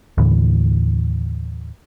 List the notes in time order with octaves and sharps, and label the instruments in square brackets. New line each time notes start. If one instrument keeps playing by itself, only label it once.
[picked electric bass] D#2 A2 D3 E3